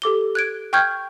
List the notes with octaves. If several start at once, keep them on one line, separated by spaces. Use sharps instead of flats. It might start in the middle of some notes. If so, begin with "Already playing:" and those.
G4 A4 D6 G7
F#6 G#6 D7
G5 C#6 F6 G6 G#6